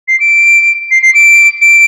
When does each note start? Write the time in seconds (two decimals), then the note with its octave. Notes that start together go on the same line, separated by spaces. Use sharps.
0.08 C7
0.20 D7
0.91 C7
1.02 C7
1.14 D7
1.62 D7